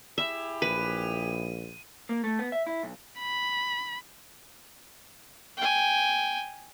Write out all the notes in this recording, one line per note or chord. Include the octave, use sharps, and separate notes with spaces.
E4 G4 G#4 E5
A#1 B4 D#7
A#3
A3
B3
E5
E4
B1
B5
G5 G#5